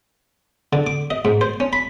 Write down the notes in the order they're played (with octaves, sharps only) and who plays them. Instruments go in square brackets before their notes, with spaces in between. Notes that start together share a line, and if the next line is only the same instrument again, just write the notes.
[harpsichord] D3
D6
D#5
G#2
C5
C#4
B5